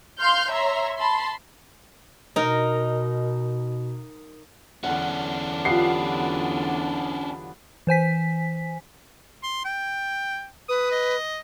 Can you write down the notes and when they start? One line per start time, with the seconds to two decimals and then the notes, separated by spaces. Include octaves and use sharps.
0.19 F5 C6 F6 G6
0.49 C#5 E5 A#5 C6
0.96 A5 B5 C6
2.36 B2 D#4 A#4
4.84 E2 D3 F#3 C#4 D4 F#5
5.65 B3 F4 G4 F5 C7
7.87 E3 C5 G#5 B6
9.43 C6
9.65 G5
10.69 B4 D#6
10.91 D#5